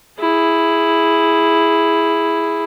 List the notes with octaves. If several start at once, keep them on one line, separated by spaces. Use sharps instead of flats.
E4 G#4